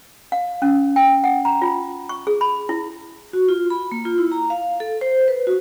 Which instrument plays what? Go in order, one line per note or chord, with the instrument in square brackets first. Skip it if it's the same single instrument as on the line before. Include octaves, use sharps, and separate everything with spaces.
[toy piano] F5
C#4
G5
F#5
A#5
F4
C#6
G#4
B5
E4
[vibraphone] F#4
F4
B5
A#3
F4
E4
A#5
F5
A4
C5
B4
F#4